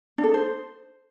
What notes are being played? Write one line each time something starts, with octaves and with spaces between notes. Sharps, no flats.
D4
A4
D#4
C5